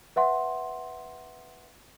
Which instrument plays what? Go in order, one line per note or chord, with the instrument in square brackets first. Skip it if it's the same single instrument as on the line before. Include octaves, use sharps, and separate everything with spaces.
[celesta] B4 E5 F#5 C6